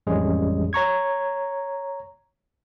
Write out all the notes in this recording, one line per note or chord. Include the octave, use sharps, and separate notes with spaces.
A1 F2 G3 G#3 C#4 G#4
C#5 A#5 C#6 G#6